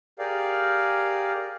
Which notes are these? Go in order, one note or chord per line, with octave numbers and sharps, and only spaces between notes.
G4 G#4 A#4 D5 F5